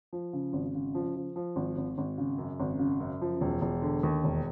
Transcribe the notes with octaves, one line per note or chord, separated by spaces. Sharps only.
F3
C#3
G#1
C#3
F3
F3
F3
G#1
G#1
G#1
C#3
F#2
G#1
C#3
F#2
F3
E1
E1
D3
D#2
E1